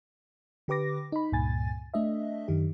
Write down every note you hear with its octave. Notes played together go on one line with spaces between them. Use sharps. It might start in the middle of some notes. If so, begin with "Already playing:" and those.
D3 G4 B4 D6 A#6
D#4 B5
C#2 G2 A#2 G#5 A6
A3 D4 D#5 E5
F#2 D#3 G4